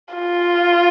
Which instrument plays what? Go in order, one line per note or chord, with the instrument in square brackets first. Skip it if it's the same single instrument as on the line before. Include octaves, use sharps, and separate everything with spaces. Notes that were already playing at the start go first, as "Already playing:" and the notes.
[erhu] F4